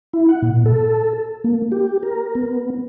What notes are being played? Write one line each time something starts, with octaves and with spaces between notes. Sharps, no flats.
E4
F#5
A#2
A4
A#3
G4
A#4
B3